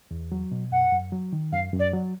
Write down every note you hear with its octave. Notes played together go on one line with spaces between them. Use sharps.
E2
F#3
B2
F#2 F#5
F#2
F#3
D#3
F#2 F5
F#2
D5
F#3